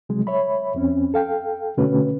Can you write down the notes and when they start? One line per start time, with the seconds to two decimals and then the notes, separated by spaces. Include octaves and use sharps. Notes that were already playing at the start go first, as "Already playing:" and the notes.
0.09 C3 F#3 G#3
0.27 C#5 E5 B5
0.74 F2 C4 C#4
1.14 A4 F5 G5
1.77 B2 D3 A3 C#4 F#4 B4